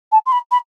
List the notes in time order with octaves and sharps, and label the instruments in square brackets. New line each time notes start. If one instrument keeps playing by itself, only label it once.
[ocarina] A5
C6
B5
B5